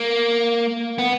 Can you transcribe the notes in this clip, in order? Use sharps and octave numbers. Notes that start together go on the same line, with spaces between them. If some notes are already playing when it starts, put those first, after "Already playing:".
Already playing: A#3
B3